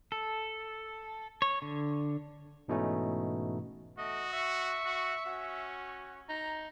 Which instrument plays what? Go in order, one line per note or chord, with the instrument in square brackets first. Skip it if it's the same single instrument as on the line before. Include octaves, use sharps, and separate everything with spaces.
[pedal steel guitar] A4
C#5
D3
[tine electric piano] G#2 B2 E3 A3 C#4 D#4
[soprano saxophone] A3 [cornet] F#4 [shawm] D#5
[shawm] E5 [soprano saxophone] C#6
[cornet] F#4
[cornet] C#4 [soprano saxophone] F#4
[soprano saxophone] D#4 [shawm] A#5